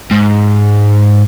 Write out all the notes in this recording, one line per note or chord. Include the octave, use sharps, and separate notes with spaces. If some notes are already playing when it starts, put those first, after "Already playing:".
G#2